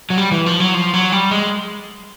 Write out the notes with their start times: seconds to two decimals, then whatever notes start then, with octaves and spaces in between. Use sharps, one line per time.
0.10 F#3
0.18 G3
0.31 E3
0.46 F3
0.60 F#3
0.74 F3
0.94 F#3
1.12 G3
1.31 G#3